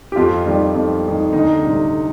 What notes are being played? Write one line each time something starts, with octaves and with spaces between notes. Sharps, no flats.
G4
F2 F4
D#3 G3
F2
D#3 G3
D2 D#4
C3 G3